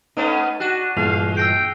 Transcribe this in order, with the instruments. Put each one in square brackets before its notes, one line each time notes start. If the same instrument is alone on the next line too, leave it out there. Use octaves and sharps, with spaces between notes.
[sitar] A3 B3 C#4 [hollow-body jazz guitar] D#4 [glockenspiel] D#7
[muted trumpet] D4 [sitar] F#4 [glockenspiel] F#6 D#7 E7
[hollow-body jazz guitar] G2 A#2 E3 [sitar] G#3 [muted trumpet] F5 [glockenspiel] F7
[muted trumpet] G5 [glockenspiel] E6 A#6 C7